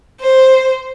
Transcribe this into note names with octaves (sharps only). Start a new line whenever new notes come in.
C5